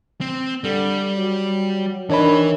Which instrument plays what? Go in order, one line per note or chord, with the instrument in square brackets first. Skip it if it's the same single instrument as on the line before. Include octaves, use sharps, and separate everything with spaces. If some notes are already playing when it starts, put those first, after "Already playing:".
[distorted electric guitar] C4
[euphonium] D3 [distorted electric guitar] G3
[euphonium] F#3
[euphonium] D#3 [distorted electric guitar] E3 B4 [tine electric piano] D4 C#5 B5